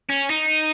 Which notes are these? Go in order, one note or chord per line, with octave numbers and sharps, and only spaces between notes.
C#4
D#4